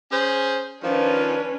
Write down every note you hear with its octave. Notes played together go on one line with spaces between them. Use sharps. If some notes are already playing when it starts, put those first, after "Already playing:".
C#4 G#4 C5
D#3 F3 C#4 D4 B4